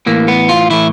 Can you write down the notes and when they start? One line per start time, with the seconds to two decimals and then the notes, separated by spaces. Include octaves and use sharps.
0.06 A2 E3 A#3
0.28 B3
0.49 F4
0.70 A2 E3 E4